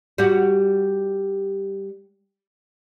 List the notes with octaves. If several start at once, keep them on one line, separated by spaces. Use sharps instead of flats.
G3 F#4